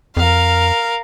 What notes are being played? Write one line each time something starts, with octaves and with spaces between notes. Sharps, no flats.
F2 A#4 F5